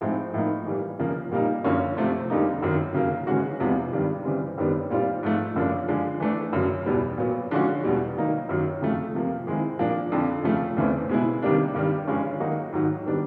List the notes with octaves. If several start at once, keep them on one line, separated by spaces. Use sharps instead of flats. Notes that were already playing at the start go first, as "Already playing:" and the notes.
A2 F3 G#3 C4 D#4
A2 F3 A#3 D#4
E3 G3 A#3
C#3 F3 A#3
A#2 G3 A#3 D#4
F#2 D3 F3 A#3 C#4
C3 F3 A3 C4
F2 D3 G3 A#3 D#4
F#2 D#3 F#3
C#3 F#3 A#3
C#3 E3 G#3 C#4 F#4
E2 C3 F3 G#3 B3
G2 D#3 G3
C#3 E3 G3 C4
F#2 D#3 G3 B3 D4
A#2 G3 C4 F4
G#2 F3 A3
F#2 C#3 F3 A#3 D4
D3 F3 G#3
E3 A3 D4
F#2 C#3 F#3
E2 B2 G3 B3
A#2 F#3 B3
D3 F3 G#3 C#4 F#4
E2 B2 G3
D#3 F#3 A#3 D#4
F#2 D#3 F#3
F2 C#3 F3 A3
C3 F3 A#3
D#3 G#3 C4 E4
A#2 F3 A#3 D4
F2 D3 F3
C#3 F3 A3
E2 C#3 E3 A3 C4
B2 G#3 B3 E4
C3 D#3 G3 A#3 D4
G2 D#3 G3
G2 D3 F3 G#3 C#4
D#3 F#3 A#3 D#4 F#4
G#2 D#3 F#3
D#3 G3 B3 D4